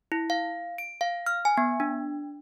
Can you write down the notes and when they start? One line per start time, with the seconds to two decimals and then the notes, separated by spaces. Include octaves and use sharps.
0.12 E4
0.30 F5
0.78 D7
1.01 F5
1.26 F6
1.45 G#5
1.58 B3
1.80 D4